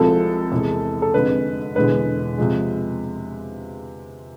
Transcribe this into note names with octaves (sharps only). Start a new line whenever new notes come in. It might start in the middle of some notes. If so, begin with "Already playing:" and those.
Already playing: C2 C3 F3 G#3 A4
E2 C3 G#3
A4
F1 F2 D3 G#3 B4
E1 E2 D3 G#3 B4
C3 F3 G#3